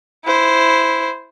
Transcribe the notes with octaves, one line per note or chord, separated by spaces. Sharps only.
E4 C5